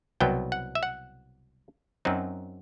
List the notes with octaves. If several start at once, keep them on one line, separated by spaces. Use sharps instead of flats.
C2 B2 F#3 B3 G5
F#5
E5
F#5
F#2 F#3 C4 D#4